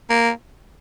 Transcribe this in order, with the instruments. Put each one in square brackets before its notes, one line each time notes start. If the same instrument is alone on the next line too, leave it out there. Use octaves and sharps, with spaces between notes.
[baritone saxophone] A#3